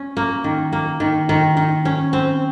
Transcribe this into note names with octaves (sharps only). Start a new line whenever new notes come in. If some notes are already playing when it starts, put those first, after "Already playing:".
Already playing: C#4
A#3
D#3
A#3
D#3
D#3
D#3
C#4
C4